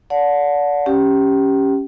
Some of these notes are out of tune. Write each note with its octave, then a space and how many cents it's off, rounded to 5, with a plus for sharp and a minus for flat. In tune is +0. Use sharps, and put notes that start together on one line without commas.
D5 -30 F#5 -30 A5 +0
C#4 +0 G4 +0 G5 -40